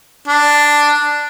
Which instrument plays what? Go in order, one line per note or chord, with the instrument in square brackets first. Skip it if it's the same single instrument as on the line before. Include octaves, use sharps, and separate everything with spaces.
[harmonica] D4